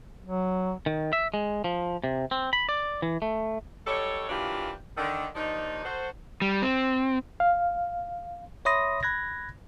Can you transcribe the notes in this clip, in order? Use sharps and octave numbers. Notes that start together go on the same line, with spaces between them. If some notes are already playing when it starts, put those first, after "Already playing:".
F#3
D#3
E5
G#3
F3
C3
C4
B5
D5
E3
A3
F#3 G3 D#4 A4 C#5
E3 F#3 A#3 D4 F4 G4
D3 D#3
D#2 F3 D4 D#4
F#4 A4 C5
G3
C4
F5
C#5 E5 B5 C6 D#6 A#6
B5 F#6 G#6 A#6